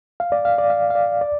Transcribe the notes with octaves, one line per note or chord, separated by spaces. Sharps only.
F5
D5
F5
D5
F5
F5
D5
D5